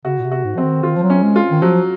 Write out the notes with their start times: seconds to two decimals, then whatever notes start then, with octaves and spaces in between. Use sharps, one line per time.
0.05 C#3 F#4
0.19 A#2
0.24 C3
0.31 F#4
0.45 G#2
0.55 F3 C4
0.63 D#3
0.83 D#3 F4
0.97 F3
1.03 F#3
1.10 C#4
1.23 G#3
1.36 F4
1.51 D#3
1.62 F3 F#3